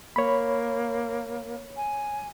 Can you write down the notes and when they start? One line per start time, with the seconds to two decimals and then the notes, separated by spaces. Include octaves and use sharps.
0.16 A#3 C#5 B5
1.77 G#5